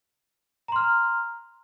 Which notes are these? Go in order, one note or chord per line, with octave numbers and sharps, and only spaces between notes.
A#5 C6 F6